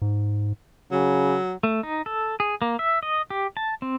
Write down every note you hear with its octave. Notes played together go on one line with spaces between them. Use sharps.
G#2
C#3 F#3
A3
D#4
A4
G#4
A#3
E5
D#5
G4
A5
C4